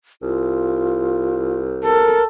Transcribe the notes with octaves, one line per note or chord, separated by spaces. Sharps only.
C2 F4
A4 A#4